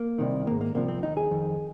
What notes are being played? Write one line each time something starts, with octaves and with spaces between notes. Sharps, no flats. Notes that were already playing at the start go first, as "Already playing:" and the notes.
Already playing: A#3
C2 C3 D#3
G#2 D#3 A#3
A#3
C2 C3 F3 A#3
C4
D#2 D#3 D#4
G#4
F2 D#3